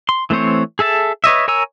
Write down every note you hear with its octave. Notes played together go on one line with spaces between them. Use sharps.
C6
E3 A3 C4 C5 C#5
G#4 A4 E5 A5
B4 C#5 D#5 E5
A#4 C#5 G#5 A#5 E6